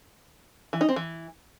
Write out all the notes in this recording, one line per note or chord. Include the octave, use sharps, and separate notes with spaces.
E3
D#4
C4
E3